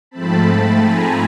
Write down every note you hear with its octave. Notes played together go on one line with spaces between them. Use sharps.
G#2 F3 A3 C4 A5 B5
G#5 A#5